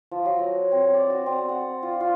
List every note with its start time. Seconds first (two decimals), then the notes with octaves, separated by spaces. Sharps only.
0.11 F3
0.25 F#3
0.39 D#5
0.72 C4
0.94 D5
1.10 F#4
1.26 C4
1.49 F#5
1.83 F4
2.01 F4